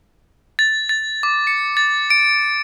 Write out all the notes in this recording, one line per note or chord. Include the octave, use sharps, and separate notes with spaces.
A6
A6
D6
C#7
A6
D7